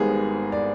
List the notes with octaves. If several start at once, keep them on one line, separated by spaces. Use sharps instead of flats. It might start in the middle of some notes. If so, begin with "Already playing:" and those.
Already playing: G#1 G#2 G3 B3 G#4
D5